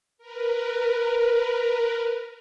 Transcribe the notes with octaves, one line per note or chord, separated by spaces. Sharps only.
A#4 B4